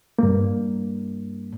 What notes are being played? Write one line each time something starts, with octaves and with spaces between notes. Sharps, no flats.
G2 A#3